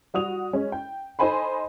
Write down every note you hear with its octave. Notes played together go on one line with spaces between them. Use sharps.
G3 F#4 D#6 F7
G#3 C#4
G5
D#4 A4 C5 G#5 B5 C6